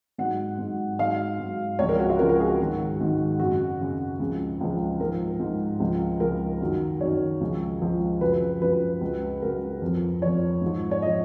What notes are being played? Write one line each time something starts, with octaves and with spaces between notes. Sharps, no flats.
G#2 F#3 F#5
G#2 F#3
G#2 F#3 F5
G#2 F#3
C#2 C#3 F3 C#5
A#4
F#4
F4
C#2 C#3 F3 A#4
A#4
G#4
F#4
G#2 D#3 F#3
G#2 D#3 F#3
F#2 C#3 F#3 F#4
F#2 C#3 F#3
C#2 C#3 F3
C#2 C#3 F3
G#2 F3 A#4
G#2 F3
C#2 C#3 F3
C#2 C#3 F3 A#4
F#2 D#3 F#3
F#2 D#3 F#3 C#5
C#2 C#3 F3
C#2 C#3 F3
F#2 C#3 F3 B4
F#2 C#3 F3 B4
C#2 C#3 F#3
C#2 C#3 F#3 A#4
F2 F3
F2 F3 C#5
G#2 F3
C#5
F3 D#5